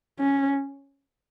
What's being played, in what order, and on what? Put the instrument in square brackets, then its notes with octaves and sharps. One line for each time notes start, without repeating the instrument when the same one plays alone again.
[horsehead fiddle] C#4